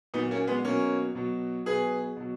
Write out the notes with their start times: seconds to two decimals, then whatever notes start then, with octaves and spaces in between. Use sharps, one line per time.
0.14 A#2 F#3 B3 D#4
0.31 A#3 C#4
0.47 G#3 B3
0.64 B2 F#3 A#3 C#4
1.15 B2 F#3
1.66 B2 F#3 G#4 B4
2.17 B2 F#3